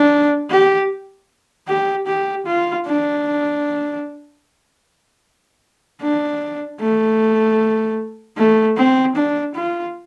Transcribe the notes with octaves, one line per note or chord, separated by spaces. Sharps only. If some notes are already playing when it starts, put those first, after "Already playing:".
Already playing: D4
G4
G4
G4
F4
D4
D4
A3
A3
C4
D4
F4